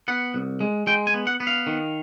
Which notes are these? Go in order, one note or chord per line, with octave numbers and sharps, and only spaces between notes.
B3 F#5
C2
G#3
G#3 G5
G#5
B3
F#5
B3
F5
D#3